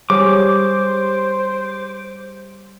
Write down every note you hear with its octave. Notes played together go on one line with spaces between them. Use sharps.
G3 G#4 C5 C#5 D6